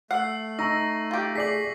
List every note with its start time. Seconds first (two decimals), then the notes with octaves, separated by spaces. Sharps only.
0.11 A3 F#5 E6 C7
0.59 D#4 A#5 C#6 E6 A#6
1.11 F4 G4
1.35 G#4 D5 B6 C7 F#7